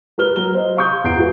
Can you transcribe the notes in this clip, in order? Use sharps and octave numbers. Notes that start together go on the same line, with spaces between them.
A#4 B4 F6 G7
F#3 A#5 G7
C5 D#5
F5 C6 C#6 D#6 G6
E2 A#5 G6 C7 D7
E4 F#4 G#4 B4